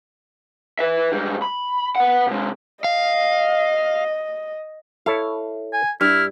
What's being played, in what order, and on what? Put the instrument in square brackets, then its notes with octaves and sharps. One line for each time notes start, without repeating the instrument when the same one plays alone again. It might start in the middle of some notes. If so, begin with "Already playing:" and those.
[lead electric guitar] B4 E5
G#2 G3
B5
B4 F#5
C3 G#3
[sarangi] D#5 [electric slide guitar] F5
[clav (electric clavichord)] E4 A4 C#5 [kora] F5
[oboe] G#5
[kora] G2 [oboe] E4 [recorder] F6